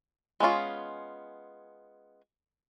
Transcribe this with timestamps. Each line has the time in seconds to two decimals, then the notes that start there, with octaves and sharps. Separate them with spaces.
0.40 G#3 B3 C#4 F4